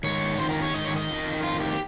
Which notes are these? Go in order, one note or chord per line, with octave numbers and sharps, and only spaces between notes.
G#2 D#3 C#5
F2 C3 D#3 C5
A#4
C#5
G#2 D#3 D#5
C#5
D#5
F2 D#3
F2 D#3 F4
G4